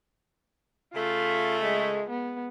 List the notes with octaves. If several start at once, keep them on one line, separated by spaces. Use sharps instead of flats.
C#3 A3 F4
G#3
B3